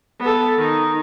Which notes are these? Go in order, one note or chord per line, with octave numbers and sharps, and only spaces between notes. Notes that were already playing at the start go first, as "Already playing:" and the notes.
B3 A4
D#3 D#4